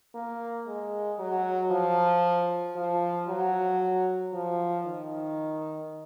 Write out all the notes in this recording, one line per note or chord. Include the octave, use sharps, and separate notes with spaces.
A#3
G#3
F#3
F3
F3
F#3
F3
D#3